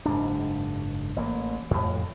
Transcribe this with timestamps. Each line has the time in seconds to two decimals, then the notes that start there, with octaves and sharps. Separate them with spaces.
0.06 F#1 G#2 D4
1.16 A1 A#3
1.71 F2 A2